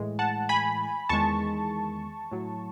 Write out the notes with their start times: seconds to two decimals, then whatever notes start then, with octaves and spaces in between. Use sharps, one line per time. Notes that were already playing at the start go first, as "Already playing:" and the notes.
Already playing: A2 E3 G#3
0.19 F#5 A5
0.49 G#5 B5
1.09 E2 D#3 G#3 A5 C#6
2.31 A2 F#3